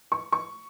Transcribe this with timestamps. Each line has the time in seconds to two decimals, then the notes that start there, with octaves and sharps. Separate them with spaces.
0.12 C#6
0.32 C#6